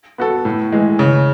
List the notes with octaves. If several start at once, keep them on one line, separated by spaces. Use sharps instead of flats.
B3 F#4 A4
A2
E3 G#3
C#3